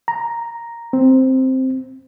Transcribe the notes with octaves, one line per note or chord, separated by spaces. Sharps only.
A#5
C4